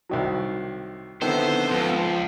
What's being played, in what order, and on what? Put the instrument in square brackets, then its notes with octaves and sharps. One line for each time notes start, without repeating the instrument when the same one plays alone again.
[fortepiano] C2 D#3 F#3
[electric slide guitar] D3 C4 [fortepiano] D#3 E4 [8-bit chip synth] B3 A4 [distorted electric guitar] C5
[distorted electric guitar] C#2 [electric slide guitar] F3